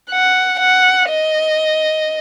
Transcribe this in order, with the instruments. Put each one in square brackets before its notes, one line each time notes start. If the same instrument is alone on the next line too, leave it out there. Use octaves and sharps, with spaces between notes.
[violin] F#5
F#5
D#5